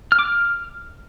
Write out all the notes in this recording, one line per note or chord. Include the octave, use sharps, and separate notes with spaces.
F6
D6
F6